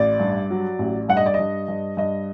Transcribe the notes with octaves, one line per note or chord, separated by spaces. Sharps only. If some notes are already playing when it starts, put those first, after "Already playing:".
Already playing: A1 D5
G2
F#3
A1
G2 F#5
D#5
D5
G2 D#5
G2
G2 D#5